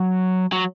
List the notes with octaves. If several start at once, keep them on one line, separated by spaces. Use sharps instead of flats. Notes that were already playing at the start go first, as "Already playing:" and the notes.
Already playing: F#3
F#3